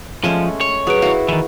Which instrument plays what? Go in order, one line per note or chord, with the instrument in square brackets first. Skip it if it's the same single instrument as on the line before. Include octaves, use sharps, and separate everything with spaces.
[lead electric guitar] F3 [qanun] G#3 A3 C#4
[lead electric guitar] C#5
[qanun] F#3 [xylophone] G#4 B4 D7
[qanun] E4 F#4 [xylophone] F5
[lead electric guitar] D#3 E3